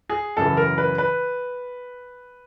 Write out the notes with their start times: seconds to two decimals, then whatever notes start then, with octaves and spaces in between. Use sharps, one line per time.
0.10 G#4
0.37 F#2 C#3 E3 A4
0.57 A#4
0.78 B4
0.98 B4